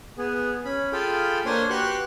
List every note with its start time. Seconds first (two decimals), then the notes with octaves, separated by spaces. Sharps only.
0.18 B3 G#4
0.65 C#4 B5
0.92 F4 G#4 A4 F5 G5 B5
1.45 A#3 D4 C5 C#5 G#5 C6
1.70 F#4 G4 B4 C6 C#6 F#6